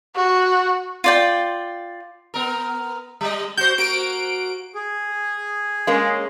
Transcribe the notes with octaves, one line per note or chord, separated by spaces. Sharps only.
F#4
F4 D5 G5
B3 A#4
G3 D#5
F#4 C5 G6
A#3 F#4 D7
G#4
G#3 A#3 C#4